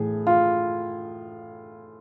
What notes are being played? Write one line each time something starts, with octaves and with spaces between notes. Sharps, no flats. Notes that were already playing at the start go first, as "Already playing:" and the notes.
Already playing: A2 E3 G#4
F4